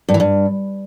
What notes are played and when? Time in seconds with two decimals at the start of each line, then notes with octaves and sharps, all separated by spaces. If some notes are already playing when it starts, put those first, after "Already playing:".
0.09 G2
0.14 E3
0.20 G2